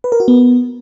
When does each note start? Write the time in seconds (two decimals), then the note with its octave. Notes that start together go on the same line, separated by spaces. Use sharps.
0.04 B4
0.12 A#4
0.20 F#4
0.28 B3